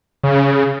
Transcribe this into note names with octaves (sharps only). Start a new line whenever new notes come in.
C#3